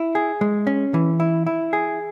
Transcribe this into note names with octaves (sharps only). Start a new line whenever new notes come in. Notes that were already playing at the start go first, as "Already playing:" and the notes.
Already playing: E4
G#4
G#3
C#4
E3
E4
E4
G#4